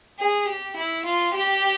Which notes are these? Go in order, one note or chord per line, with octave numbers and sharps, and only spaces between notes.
G#4
G4
E4
F4
G4